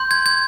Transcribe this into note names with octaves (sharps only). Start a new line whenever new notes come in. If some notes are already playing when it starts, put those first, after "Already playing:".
Already playing: C6 G6
G#6
G#6